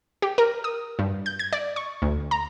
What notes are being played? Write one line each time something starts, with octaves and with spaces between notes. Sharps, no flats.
G4
A#4
D#6
G2
G6
G#6
D5
C#6
D2
A#5